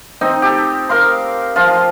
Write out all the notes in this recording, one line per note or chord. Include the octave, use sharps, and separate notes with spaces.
C4 D#4 D#5
G4 A4
A#4 F5 C6
F3 F4